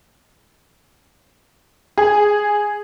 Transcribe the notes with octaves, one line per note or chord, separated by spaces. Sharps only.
G#4